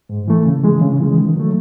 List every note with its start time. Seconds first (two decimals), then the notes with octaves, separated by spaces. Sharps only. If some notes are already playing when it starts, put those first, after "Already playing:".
0.09 G#2
0.28 E3 A3
0.45 C#3
0.63 E3 G#3
0.82 C#3
1.00 E3 G#3
1.18 D#3
1.36 F#3 A3